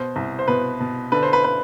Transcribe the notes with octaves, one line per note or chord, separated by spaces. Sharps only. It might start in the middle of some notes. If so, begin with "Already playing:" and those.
Already playing: B2 C5
C2
C5
B2 B4
B2
D3 B4
C5
B4
B4